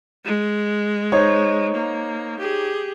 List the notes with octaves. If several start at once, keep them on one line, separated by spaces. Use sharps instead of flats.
G#3
D#4 C5 C#5
A#3
G4 G#4